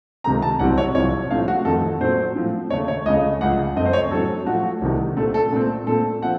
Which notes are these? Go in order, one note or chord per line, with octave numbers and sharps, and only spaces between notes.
C#2 C3 D#3 A3 C4 A#5
A5
C2 C3 F#3 C4 F#5
C#5
C2 C3 F3 C#5
A2 F3 A3 C4 F5
F#4
F2 D#3 A3 C4 A4
A#2 F#3 A3 C4 C5
A2 F3 C4
D#2 C#3 A3 C#5
C#5
C#2 C#3 A3 D#5
C#2 C#3 F3 F#5
F#2 F3 A3 C4 D#5
C5
C#5
A2 F#3 C4 A4
A2 F3 A3 F#4
C2 C3 D#3 A3
A#2 A3 C4 A4
A4
A#2 A3 C4
A#2 A3 C4 A4
F3 C4 F#5